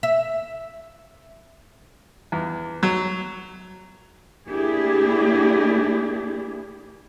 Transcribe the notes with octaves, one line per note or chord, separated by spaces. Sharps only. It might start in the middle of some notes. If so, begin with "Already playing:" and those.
E5
E2
F#3
A3 A#3 D4 E4 G4 G#4